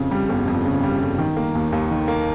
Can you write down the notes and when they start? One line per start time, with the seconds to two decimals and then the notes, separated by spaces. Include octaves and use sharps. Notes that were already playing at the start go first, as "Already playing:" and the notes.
Already playing: F2 C#3
0.11 G3
0.29 G1
0.48 F2
0.65 C#3
0.83 G3
1.01 G1
1.18 D#3
1.37 A#3
1.55 D#2
1.72 D#2
1.91 D#3
2.08 A#3